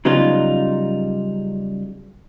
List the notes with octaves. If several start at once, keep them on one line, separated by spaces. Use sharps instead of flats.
C#3 F#3 G3 B3 D#4 F4